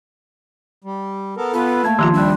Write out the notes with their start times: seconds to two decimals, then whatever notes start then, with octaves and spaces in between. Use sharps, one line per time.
0.84 G3
1.37 B3 A4 A#4
1.54 B3 F4 A4 B4
1.84 A3 A#3 A5 G#6
1.99 C3 D#3 F3 F4 G4 A#5 C6
2.13 D#2 G3 D4 E5 F#6